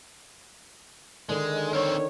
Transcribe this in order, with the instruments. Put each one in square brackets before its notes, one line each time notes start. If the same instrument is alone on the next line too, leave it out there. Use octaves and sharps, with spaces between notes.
[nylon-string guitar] D3 D#3 [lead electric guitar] G#3
[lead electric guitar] C4 A#4 [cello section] C#5